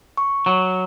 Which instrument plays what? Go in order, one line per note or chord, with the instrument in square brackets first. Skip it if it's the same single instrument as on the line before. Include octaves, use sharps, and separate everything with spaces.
[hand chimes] C#6
[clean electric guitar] F#3